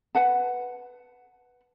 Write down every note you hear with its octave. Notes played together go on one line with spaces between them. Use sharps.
B4 F#5 A5